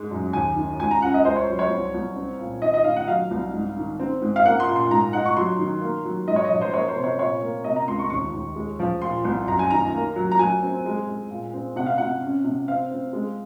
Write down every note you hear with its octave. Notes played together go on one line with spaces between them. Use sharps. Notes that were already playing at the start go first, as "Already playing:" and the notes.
Already playing: G#2 G#3
F#2
D#2 G#5
D#3
C#2 G#5
A#5
C#4 F#5
D#5
C#2 C5
C#5
F#3
C#5
C2
C2
C4
A#2
D#3 D#5
D#5
D#3 F5
F#5
F#3 F5
C2
G#2
D#3
C4
G#2
F5
A#3 F#5
C6
A#2
C6
G#2 A#5
D#4 F#5
C#6
F#3 C6
D#3
A#3
F#3
G#2 D#5
C#5
D#5
F3
C5
A#3 C#5
C5
C3
C#5
A#2 C#5
A#3
C3 D#5
A#5
C#2 C6
C#6
D#2 C#6
D#2
G#3
F3
A#2 C6
C2
F#2 A#5
G#5
D#3 A#5
A#3
F#3
A#5
F#3 G#5
C4
G#3
G#3
A#2
C4
C3 F#5
F5
C3 F#5
C#4
C3
C4 F5
C4
G#3